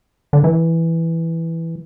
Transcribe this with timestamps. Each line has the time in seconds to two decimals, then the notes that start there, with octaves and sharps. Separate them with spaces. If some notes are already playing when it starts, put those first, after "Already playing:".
0.33 D3
0.44 E3